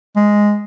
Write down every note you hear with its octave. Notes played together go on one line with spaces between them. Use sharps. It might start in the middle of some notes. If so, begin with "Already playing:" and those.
G#3